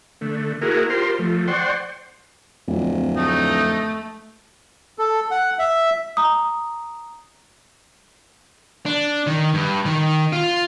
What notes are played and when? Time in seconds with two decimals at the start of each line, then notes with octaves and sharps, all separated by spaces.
0.21 D3 A3
0.62 A#3 E4 F#4 G#4 A#4
0.90 F4 G4 A#4 C5 C6
1.19 F3 A3
1.47 C5 D5 F#5 G5 C6 C#6
2.68 D1 F2 F3
3.17 A3 D#4
4.99 A4
5.31 F#5
5.59 E5
6.17 A#5 D#6
8.86 D4
9.27 D#3
9.54 G2
9.85 D#3
10.32 F4